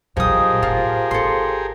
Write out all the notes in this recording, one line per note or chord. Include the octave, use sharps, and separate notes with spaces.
A#1 F3 F#3 D#4 G4 G#4 A#4 D#6
A2 F4
G#1 A4 C6